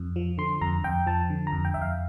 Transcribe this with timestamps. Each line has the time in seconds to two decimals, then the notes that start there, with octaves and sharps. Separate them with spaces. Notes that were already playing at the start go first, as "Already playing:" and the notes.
Already playing: F2
0.16 F3
0.38 D3 C6
0.61 F2 A#5
0.84 F2 G5
1.06 F3 A5
1.30 D3
1.47 A#5
1.52 F2
1.65 G5
1.74 F2 E5
1.81 F5